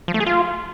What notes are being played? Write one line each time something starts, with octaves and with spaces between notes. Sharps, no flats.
F3
A3
G#4
F4